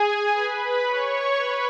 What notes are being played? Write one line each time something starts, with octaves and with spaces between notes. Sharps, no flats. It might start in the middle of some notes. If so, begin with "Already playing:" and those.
Already playing: G#4 G#5
B4 B5
C#5 C#6
B4 B5